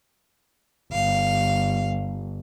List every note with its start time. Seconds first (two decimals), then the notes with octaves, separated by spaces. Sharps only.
0.93 G1 F5